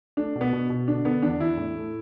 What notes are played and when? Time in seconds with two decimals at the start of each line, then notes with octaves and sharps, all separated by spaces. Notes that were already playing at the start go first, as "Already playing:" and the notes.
0.17 A3 D4
0.35 B2
0.41 B3
0.53 B2
0.70 B2
0.88 D3 D4
1.05 D3 B3
1.22 E2 D4
1.40 E2 E4
1.57 A2
1.75 A3